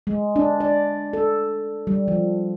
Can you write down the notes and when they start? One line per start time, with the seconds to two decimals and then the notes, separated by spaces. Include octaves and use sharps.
0.07 G#3
0.36 D4
0.60 D5
1.13 A4
1.87 G3
2.08 F3